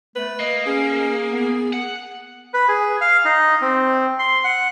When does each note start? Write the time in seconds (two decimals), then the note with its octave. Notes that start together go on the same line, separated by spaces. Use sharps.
0.16 A3 B4
0.40 A#3 D#5
0.66 C#4 G#4
1.30 B3
1.73 F#5
2.54 B4
2.68 G#4
3.01 F5
3.25 D#4
3.61 C4
4.19 C6
4.44 F#5